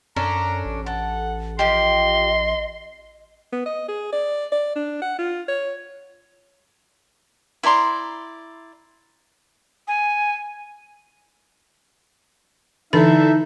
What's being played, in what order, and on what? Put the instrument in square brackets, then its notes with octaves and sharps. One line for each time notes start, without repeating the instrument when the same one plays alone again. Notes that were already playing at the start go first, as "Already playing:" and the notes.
[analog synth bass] F#2 [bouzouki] C#4 D4 A4 [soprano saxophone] A#5
[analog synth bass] A1
[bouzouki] A4 [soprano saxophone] F#5
[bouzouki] F3 G4 [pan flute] D#5 [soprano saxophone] C6
[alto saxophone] B3
D#5
G#4
D5
D5
D4
F#5
F4
C#5
[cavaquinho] E4 D5 A#5 C6
[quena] G#5
[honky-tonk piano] D3 [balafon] E3 B5 [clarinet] D#4 [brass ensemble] E4 A4 E5